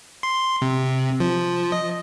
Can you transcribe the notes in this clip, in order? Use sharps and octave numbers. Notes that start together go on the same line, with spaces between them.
C6
C3
F3
D#5